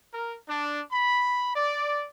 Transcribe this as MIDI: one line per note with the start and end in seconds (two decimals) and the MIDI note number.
0.14 0.37 70
0.48 0.82 62
0.91 1.52 83
1.56 2.08 74